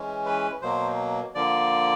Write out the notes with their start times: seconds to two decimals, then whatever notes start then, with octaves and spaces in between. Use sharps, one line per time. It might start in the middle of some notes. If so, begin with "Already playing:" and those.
Already playing: E3 G#3 C#4
0.26 B4
0.62 B2 F#3 A#3 C5
1.35 D3 F3 A#3 D5